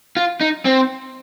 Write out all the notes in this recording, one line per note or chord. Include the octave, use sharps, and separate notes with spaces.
F4
D#4
C4